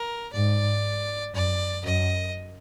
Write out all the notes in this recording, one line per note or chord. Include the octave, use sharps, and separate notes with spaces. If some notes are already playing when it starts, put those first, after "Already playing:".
Already playing: A#4
G#2 D5
F#2 D5
F#2 D#5